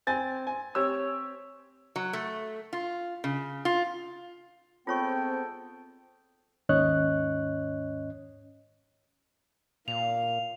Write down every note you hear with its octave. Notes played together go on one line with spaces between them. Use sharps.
C4 G#5 A6
G#5
C4 G4 C#5 E6
F#3
A3
F4
C#3
F4
G#2 B3 C4 F4 A4 C#5 G5 C#6
D#2 G#2 C#4 C#5 D#5 F#6
A#2 F5 F7